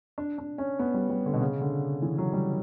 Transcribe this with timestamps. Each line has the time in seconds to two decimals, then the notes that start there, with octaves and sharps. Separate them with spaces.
0.18 D4
0.38 D4
0.58 C#4
0.79 B3
0.94 G3
1.10 G3
1.26 D3
1.33 B2
1.41 C#3
1.61 D3
2.02 E3
2.18 F#3
2.33 G3